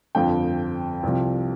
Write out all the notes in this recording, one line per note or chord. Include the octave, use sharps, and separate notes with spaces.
G1 F2 F3 G5
C2 C3 F3